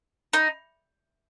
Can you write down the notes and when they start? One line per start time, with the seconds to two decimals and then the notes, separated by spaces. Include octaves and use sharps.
0.33 D#4